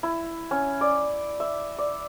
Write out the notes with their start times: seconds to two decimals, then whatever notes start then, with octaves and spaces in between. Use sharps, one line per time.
0.03 E4
0.51 C#4
0.81 D5
1.40 E5
1.79 D5